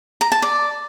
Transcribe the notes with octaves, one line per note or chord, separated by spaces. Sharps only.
A#5
A5
D5